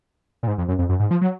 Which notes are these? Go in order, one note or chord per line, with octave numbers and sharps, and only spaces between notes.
A#2
G#2
F2
F#2
F2
F#2
G#2
F3
F#3